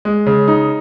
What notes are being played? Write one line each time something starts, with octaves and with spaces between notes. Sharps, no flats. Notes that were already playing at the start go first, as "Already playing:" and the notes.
G#3
C#3
D#4